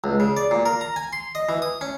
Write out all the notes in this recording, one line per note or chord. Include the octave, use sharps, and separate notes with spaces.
C#2
C#3
D5
A#2
A#4
A#5
G#5
C6
D#5
E3
D#6
C#4